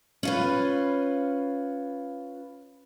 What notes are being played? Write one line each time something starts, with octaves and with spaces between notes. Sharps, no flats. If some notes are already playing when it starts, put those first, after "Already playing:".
C#4 F4 B4